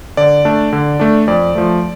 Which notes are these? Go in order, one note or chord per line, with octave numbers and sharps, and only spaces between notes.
D3 D5
A3 D4
D3
A3 D4
F2 D5
F3 A3